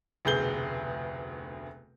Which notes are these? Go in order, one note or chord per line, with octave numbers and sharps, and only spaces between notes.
F1 D2 B2 G#4 G6 G7